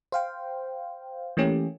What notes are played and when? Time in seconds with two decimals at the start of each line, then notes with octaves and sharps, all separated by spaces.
0.12 C5 F5 G5
1.37 E3 A3 A#3 C#4 G4